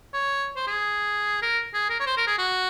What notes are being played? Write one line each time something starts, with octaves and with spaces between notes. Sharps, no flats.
C#5
C5
G#4
A#4
G#4
A#4
C#5
C5
A#4
G#4
F#4